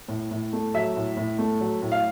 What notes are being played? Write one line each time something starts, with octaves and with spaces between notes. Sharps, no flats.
A2
A2
A3
F#3 E5
A2
A2
A3
F#3
A2
F5